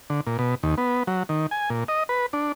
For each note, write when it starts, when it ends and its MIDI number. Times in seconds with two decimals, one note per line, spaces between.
0.10 0.21 50
0.27 0.37 46
0.39 0.55 47
0.63 0.75 39
0.78 1.03 59
1.07 1.23 54
1.29 1.47 51
1.51 1.70 80
1.70 1.84 46
1.88 2.03 75
2.09 2.26 71
2.33 2.52 62